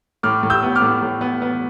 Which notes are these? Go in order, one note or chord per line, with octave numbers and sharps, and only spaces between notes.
A2 D6 F6
A2
E6 G6
B3
D6 F6
A2
A2
B3
B3